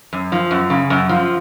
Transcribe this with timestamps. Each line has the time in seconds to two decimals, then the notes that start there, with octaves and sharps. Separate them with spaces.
0.13 F#2
0.32 F3
0.51 F#2
0.70 C#3
0.90 F#2
1.09 F3